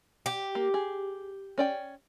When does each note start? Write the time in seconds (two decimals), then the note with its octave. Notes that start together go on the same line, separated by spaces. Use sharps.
0.26 G4
0.55 A#3
0.74 G#4
1.58 C#4 D5 G5